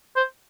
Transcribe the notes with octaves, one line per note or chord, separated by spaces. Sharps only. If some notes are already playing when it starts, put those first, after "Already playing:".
C5